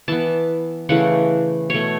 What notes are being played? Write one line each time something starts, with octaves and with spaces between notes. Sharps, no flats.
E3 B3 A5
C#3 E3 A3 F#5
B2 A3 C#5